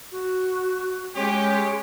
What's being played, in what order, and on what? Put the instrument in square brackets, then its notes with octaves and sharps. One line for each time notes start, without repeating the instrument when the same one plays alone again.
[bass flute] F#4
[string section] G#3 [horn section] C#4 G4 [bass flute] C#5